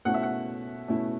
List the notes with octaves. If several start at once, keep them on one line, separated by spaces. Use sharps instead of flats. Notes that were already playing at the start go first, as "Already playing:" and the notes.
B2 A3 C#4 E4 F#5
E5
F#5
B2 A3 C#4 E4